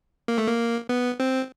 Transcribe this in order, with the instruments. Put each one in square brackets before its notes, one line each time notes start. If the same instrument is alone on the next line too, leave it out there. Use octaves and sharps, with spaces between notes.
[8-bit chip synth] A#3
A3
A#3
B3
C4